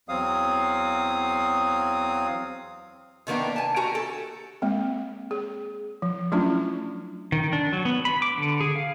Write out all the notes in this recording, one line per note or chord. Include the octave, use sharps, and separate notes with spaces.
E2 F#3 C4 F5 D#6
C3 D#3 A#3 B3 D4
G#5 A5
F#4 G4 A#4 G#5 A#5
A4
G#3 A#3 C4
G#4
F3
F#3 A3 C#4 D4 E4 F4
D#3
D4
F#3
B3
B5
D6
D3
G#4
F5